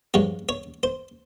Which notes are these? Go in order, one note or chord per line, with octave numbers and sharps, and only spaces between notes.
G2 F3 G#3 C#5
C#5
C5